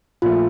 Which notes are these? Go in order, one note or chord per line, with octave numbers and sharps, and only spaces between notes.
A#1 A#2 F3 A3 F4